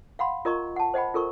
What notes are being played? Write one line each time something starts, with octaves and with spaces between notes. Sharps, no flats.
F5 F#5 B5 C6
F4 A#4 D#5 A#5 C#6
F#5 A5
C5 D#5 F#5 G5 B5
F4 A4 A#4 C#6